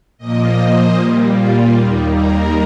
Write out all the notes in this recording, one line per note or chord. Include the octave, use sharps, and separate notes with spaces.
A#2 F3 A#3 D#5
C5
A#2 G3 A#3
F4
D#2 D#3 G3 A#3
A#4